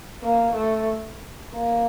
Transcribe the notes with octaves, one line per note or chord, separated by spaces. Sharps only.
A#3
A3
A#3